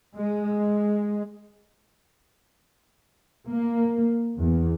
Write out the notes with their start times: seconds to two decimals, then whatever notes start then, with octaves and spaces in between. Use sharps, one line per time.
0.17 G#3
3.48 A#3
4.38 E2